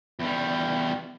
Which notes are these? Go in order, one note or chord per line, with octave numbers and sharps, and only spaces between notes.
E2 G3